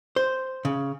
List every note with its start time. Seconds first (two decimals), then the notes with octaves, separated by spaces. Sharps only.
0.16 C5
0.65 C#3